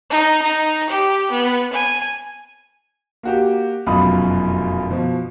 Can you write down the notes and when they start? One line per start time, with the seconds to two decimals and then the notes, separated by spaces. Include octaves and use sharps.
0.10 D#4
0.42 D#4
0.89 G4
1.31 B3
1.73 G#5
3.23 A#3 F#4 G4
3.86 F1 F#2 B2 F4 B5 D#6
4.91 B2 F3